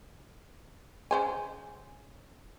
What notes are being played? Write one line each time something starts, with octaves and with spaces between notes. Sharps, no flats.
C#3 C5 G#5